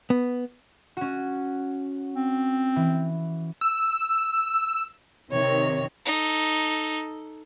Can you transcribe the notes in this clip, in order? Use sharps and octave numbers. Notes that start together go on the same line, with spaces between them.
B3
C#4 F#4
C4
E3
E6
C3 D#3 C#5
D#4 A4